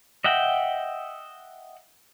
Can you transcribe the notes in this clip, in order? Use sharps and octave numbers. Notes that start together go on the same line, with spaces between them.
D#5 E5 F#5 G5